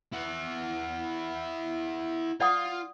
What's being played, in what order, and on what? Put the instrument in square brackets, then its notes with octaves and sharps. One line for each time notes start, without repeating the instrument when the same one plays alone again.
[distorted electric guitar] E4 F#5
[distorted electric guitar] F4 [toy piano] D5 F#5 D#6